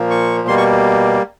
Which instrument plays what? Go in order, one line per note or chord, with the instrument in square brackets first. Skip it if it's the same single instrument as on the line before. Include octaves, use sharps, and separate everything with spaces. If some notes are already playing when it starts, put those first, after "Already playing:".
Already playing: [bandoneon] A#2 F3 A#3
C#6
B2 G3 A#3 C6
C#6